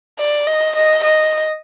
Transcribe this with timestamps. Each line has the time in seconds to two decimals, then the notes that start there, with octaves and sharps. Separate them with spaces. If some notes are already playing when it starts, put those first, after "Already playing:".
0.19 D5
0.47 D#5
0.76 D#5
1.04 D#5